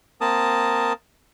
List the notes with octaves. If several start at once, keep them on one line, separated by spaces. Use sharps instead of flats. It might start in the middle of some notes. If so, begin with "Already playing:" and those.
A#3 C4 A#4 A5 D#6